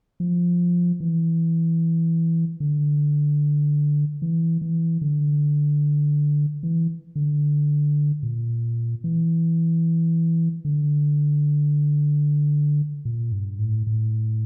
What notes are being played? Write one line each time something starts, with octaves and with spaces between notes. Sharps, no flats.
F3
E3
D3
E3
E3
D3
E3
D3
A#2
E3
D3
A#2
G2
A2
A2